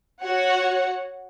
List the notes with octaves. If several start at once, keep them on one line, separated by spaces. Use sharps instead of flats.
F#4 C#5 F#5